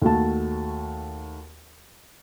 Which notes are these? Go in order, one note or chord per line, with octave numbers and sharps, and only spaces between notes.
D#2 A3 F#4 A5